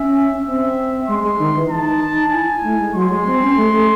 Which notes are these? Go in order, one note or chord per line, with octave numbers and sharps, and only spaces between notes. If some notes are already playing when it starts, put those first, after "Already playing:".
Already playing: C#4 E5
C#4
C4 E5
G#3 C6
G#3
D#3
E3
D#4 A5
E4 G#5
E4
A3
G#3
F#3 C6
G#3
C4
C#4
A3
A3